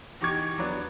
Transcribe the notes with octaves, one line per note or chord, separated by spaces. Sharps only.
E2 D#4 G4 C#6 D6 G#6
F#3 B3 D4